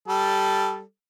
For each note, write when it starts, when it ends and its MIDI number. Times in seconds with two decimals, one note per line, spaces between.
0.08 0.82 55
0.08 0.82 69